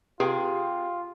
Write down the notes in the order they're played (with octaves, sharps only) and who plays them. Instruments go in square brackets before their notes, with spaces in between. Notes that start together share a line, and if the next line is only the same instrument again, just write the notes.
[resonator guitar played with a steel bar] C3 G#4 G5 [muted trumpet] F4 [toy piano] G4